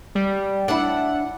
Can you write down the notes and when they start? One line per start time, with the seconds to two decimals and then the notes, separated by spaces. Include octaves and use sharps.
0.15 G3
0.68 D4 E4 F#5